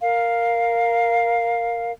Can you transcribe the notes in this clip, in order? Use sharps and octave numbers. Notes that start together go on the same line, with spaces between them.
A#4 F5